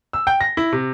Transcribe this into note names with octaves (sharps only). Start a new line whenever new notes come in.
E6
G5
A#6
E4
C3